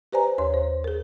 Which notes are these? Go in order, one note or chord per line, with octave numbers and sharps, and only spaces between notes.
G4 B4 C5 D5 G#5 A#5
D#2 C#5 C6
C5
G#4 A#4